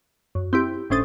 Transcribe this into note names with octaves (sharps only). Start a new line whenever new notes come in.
F#2
C4 E4 G4
G1 A2 C#4 C5 D#6 A6